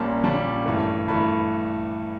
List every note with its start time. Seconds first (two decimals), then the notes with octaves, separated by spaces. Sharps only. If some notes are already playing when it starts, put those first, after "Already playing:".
Already playing: A#1 A#2 G3 A#3 C#4 A5
0.23 A#1 A#2 G3 A#3 C#4 A5
0.66 G2 E3 A3
1.08 G2 E3 A3 B5